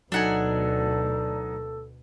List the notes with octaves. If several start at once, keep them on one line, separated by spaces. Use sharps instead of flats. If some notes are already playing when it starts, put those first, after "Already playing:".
D2 B2 F#3 D4 D#4 A4 F#5 G#5